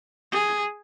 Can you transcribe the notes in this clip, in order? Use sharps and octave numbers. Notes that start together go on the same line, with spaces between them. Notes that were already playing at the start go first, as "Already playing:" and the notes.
G#4